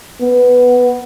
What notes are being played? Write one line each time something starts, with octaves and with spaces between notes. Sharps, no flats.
B3